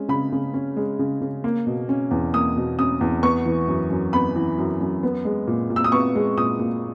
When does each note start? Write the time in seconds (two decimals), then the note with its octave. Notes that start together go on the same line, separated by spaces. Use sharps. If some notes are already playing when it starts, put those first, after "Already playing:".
Already playing: G#3 C#4
0.09 C#3 B5
0.32 C#3
0.54 C#4
0.76 G#3
0.99 C#3
1.21 C#3
1.44 A#3
1.67 B2
1.89 C#4
2.11 E2
2.34 A#3 D#6
2.56 B2
2.79 C#4 D#6
3.01 E2
3.23 B3 C#6
3.46 E3
3.68 F#2
3.90 F#2
4.13 B3 B5
4.36 E3
4.58 F#2
4.80 F#2
5.03 B3
5.25 G#3
5.47 A#2
5.70 A#2
5.76 E6
5.84 D#6
5.92 B3 C#6
6.15 G#3
6.37 A#2 D#6
6.59 A#2